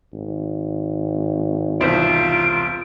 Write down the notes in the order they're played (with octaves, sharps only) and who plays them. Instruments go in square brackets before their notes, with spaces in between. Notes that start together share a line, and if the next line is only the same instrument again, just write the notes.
[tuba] G#1
[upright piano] E1 C2 C5 [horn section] F4 [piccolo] D7